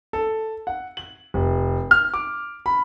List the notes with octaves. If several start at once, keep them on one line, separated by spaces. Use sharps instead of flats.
A4
F#5
F#7
F1
F6
D6
B5